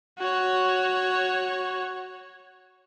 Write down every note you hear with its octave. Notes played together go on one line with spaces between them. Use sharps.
F#4 C#5